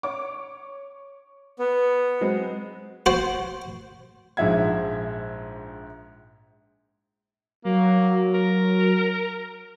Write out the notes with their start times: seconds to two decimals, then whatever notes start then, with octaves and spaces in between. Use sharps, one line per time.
0.03 C#5 D6
1.59 B3
2.21 F#3 G#3 C4
3.06 F#4 C5
4.37 A#1 G#2 F3 E5 F#5 G#6
7.65 F#3 A#3
8.34 A#4